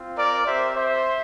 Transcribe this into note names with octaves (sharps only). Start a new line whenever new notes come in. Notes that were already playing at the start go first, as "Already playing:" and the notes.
Already playing: C4 F4
A#4 D5
C4 G4 C5 E5
C5 E5